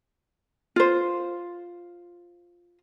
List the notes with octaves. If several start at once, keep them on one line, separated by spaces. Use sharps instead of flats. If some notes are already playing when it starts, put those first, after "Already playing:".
F4 C5